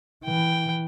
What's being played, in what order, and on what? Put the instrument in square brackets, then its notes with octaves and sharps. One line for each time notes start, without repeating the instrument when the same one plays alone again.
[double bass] E3 [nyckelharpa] G5